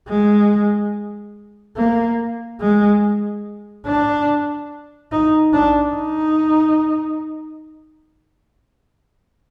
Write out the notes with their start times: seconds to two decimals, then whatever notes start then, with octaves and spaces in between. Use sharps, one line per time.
0.08 G#3
1.77 A#3
2.61 G#3
3.86 D4
5.12 D#4
5.53 D4
5.95 D#4